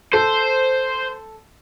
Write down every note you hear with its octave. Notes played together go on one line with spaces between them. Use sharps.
A4 C5